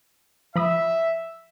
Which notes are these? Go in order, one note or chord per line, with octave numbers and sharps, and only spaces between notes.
F3 E5 B5 D#6